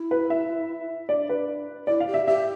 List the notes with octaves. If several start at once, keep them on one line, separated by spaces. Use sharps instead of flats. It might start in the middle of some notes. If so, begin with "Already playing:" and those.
Already playing: E4
B4
E5
D4 D5
B4
E4 D5
F5
G4
E5
G4 E5